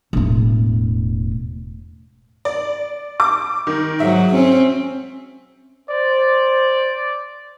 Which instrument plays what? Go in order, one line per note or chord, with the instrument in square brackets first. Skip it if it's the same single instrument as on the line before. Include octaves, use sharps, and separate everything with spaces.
[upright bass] E1 A2
[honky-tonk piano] D5
D6
D#3
[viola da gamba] G#2 F#3 [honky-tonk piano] E5
[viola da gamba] C4 C#4
[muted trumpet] C5 [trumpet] D5